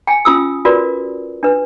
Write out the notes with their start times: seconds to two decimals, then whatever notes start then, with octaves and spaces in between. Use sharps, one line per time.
0.07 G5 G#5
0.25 C#4 F4 D#6 E6
0.65 F4 F#4 A#4 B4 D5
1.43 D4 B4